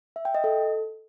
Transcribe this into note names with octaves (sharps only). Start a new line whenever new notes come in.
E5
G5
D#5
A4